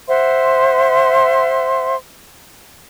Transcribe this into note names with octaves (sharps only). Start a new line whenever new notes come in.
C5 E5 F#5 C6